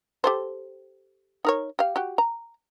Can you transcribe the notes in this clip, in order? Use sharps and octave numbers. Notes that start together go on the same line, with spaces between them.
G4 A4 C5
D#4 A#4 C#5
G4 F5
F#4 G4
A#5